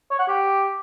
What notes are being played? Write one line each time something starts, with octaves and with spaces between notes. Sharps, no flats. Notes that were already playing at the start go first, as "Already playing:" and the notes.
C#5
F#5
G4